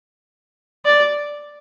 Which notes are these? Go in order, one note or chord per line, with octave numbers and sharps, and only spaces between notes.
D5